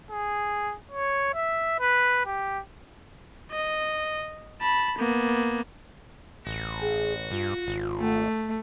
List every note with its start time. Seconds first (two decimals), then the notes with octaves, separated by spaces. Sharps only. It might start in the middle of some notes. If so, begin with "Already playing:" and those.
0.11 G#4
0.92 C#5
1.35 E5
1.79 B4
2.26 G4
3.51 D#5
4.61 A5 B5
4.98 A#3 B3
6.47 A1 F#4
6.81 G#4
7.31 G2 F4
7.67 G#1
7.99 A3